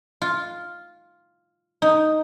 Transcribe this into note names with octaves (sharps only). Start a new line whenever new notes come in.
F4
D#4